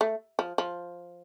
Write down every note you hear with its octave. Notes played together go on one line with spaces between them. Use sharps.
A3
F3
F3